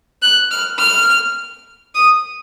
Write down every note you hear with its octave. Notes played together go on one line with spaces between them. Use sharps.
F#6
F6
F6
D#6